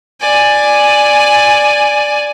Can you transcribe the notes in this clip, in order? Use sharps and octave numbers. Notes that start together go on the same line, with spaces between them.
D5 G#5